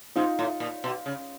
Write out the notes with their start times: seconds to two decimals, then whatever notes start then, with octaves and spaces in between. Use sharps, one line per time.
0.16 G#2 D#4 F4
0.39 A2
0.60 A#2
0.84 B2
1.06 C#3